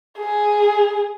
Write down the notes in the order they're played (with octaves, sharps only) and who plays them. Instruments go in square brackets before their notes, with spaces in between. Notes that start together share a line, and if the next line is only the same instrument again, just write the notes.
[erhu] G#4